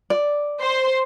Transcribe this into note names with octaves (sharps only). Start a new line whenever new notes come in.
D5
C5 C6